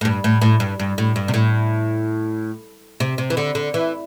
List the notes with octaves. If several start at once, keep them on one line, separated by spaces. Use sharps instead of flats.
A2
G2
A2
A2
G2
G2
A2
G2
C3
A2
C3
C3
E3
D3
D3
E3